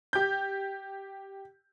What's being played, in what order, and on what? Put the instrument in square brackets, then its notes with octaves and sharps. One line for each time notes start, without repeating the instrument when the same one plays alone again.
[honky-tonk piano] G4 G6